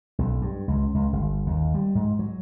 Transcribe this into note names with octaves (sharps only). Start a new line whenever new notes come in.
B1
G2
C#2
C#2
G1
D#2
G3
G#2
F#3